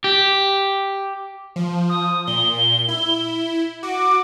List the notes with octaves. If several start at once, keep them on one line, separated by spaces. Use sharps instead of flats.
G4
F3
D#6
A#2 G7
E4
F#4 D6